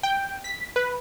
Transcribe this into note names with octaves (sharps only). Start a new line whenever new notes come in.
G5
B6
B4